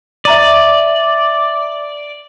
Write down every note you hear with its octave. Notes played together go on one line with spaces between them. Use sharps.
D5 E5 A#5 D#7